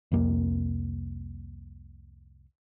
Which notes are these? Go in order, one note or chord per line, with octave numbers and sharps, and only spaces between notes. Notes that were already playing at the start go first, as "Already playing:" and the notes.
C2 F2 A#3